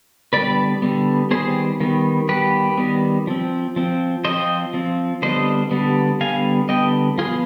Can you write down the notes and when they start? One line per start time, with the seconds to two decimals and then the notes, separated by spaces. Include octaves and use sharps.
0.33 D3 G3 B3 B4 D5
0.82 D3 G3 B3
1.31 D#3 G3 B3 G#4 C5
1.80 D#3 G3 B3
2.29 D#3 G3 B3 G4 B4
2.78 D#3 G3 B3
3.27 F3 C4
3.76 F3 C4
4.25 F3 C4 C5 D#5
4.74 F3 C4
5.22 D3 G3 B3 C5 D#5
5.71 D3 G3 B3
6.21 D3 G3 B3 F5 G#5
6.69 D3 G3 B3 D#5 G5
7.18 F3 B3 F4 G#4